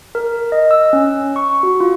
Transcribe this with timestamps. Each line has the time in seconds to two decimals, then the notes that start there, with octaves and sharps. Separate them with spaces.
0.15 A#4
0.52 D#5
0.71 E6
0.93 C#4
1.36 C#6
1.63 F#4
1.80 F4